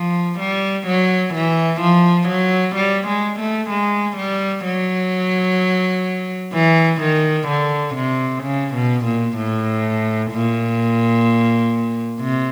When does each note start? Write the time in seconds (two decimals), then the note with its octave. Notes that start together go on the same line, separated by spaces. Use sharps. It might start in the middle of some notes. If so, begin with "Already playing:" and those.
Already playing: F3
0.39 G3
0.87 F#3
1.34 E3
1.81 F3
2.29 F#3
2.76 G3
3.07 G#3
3.39 A3
3.70 G#3
4.17 G3
4.65 F#3
6.54 E3
7.01 D#3
7.48 D3
7.95 C3
8.43 C#3
8.75 B2
9.05 A#2
9.37 A2
10.31 A#2
12.20 C3